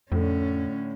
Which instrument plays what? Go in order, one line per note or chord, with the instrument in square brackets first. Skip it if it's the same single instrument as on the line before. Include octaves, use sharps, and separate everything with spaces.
[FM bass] F2 [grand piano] A2 D3 [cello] C#4